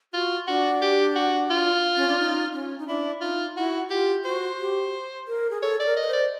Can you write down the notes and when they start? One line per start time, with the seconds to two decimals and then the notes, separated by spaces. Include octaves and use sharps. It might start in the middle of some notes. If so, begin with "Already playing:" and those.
0.14 F4 F#4
0.48 D4 F#4
0.82 G4
1.15 F#4
1.51 F4
1.97 C#4
2.08 D4
2.19 D#4
2.53 C#4
2.79 D#4
2.88 D4 E4
3.21 D#4 F4
3.56 E4 F#4
3.90 F4 G4
4.25 F#4 C5
4.59 G4
5.28 A#4
5.50 G#4
5.62 A4 C#5
5.80 A4 D5
5.86 A#4
5.97 D#5
6.02 B4
6.07 C5
6.13 D5